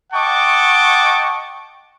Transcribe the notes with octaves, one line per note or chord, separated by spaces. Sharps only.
D#5 F#5 G5 A5 C#6 D6